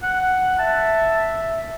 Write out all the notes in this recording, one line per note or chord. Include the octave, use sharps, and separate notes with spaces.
F#5
E5 A5